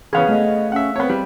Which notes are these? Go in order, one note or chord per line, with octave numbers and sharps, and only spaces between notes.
C#3 E3 B3 C#4 G#4 F5
A3 D#5
C#4 E5 F#5
B3 C4 C#5
G3